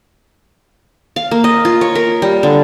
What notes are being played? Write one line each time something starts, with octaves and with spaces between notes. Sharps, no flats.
F5
A#3
D#5
F4
C#5
A#4
G3
D3